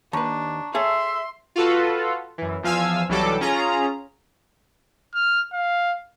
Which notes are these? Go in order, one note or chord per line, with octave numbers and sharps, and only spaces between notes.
D#2 D4 B4 A5 A#5 C#6
G#4 A4 C#5 E5 C6
F4 F#4 A4 B4
F#2 E3
E2 F3 F5 G#5 E6
B1 E3 F#3 G3 A4 D6
C#4 F4 G#4 A#5
F6
F5